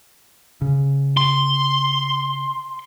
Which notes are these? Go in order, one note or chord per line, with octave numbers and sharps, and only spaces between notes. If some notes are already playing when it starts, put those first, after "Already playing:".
C#3
C6